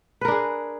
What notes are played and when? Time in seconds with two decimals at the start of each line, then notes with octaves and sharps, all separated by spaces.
0.21 B4
0.25 A#4
0.28 D4
0.32 G#4